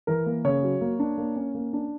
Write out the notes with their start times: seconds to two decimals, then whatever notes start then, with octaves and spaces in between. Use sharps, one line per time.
0.07 E3 A#4
0.26 A#3
0.45 C#3 C#5
0.63 F#3
0.81 A#3
1.00 D4
1.18 A#3
1.36 C#4
1.55 A#3
1.73 D4